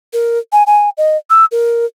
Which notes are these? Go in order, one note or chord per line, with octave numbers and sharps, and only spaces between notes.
A#4
G#5
G#5
D#5
E6
A#4